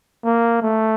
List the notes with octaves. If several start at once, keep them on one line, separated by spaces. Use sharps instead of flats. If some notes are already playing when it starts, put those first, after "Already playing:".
A#3
A3